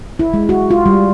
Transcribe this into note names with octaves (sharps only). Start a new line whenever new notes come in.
E4
G#3
F#4
F4
G3